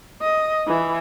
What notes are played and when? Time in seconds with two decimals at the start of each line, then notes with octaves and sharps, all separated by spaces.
0.22 D#5
0.68 E3